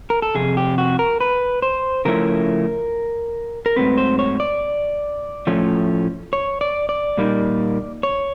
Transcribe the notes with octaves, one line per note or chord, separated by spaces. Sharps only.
A#4
A4
F2 C3 G#4
G4
F#4
A#4
B4
C5
C#3 F3 A3 C#4 E4 A#4
A#4
G#2 D#3 F#3 A3 C4 B4
C5
C#5
D5
A2 F3 A3 C#4
C#5
D5
D5
A#2 G3 A#3 D#4
C#5